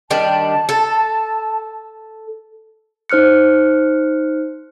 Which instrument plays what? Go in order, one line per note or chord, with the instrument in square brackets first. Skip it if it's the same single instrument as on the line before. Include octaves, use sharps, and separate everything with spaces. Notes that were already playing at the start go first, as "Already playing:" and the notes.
[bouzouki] D#3 G3 D4 [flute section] A5
[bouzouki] A4
[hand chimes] D#4 C5 F6 F#6 C#7